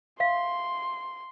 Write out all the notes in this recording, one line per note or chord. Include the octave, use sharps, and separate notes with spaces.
E5 F5 C6